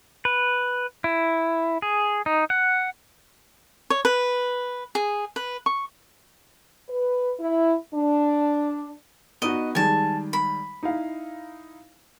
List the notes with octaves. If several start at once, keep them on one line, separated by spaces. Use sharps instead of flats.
B4
E4
G#4
D#4
F#5
C#5
B4
G#4
B4
C#6
B4
E4
D4
B3 D#4 F#4 D#5
D#3 G3 G#3 G#5 A5
B5
D#4 E4 F5